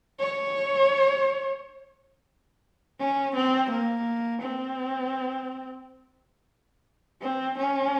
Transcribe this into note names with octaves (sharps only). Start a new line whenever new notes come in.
C#5
C#4
C4
A#3
C4
C4
C#4